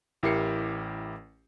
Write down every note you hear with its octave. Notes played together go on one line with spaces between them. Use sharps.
A1 E4 G4 A#4 C7 C#7